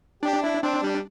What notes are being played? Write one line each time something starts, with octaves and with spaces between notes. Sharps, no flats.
D4 G4
E4
C4 D4
G3